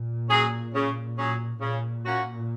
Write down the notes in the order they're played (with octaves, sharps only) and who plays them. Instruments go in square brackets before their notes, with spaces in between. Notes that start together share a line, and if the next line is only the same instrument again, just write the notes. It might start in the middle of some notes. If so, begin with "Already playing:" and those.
Already playing: [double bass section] A#2
[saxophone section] F#3 C#4 G#4
C#3
F#3 C#4 G#4
[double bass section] A#2 [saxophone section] C#3
[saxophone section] A#3 C#4 F#4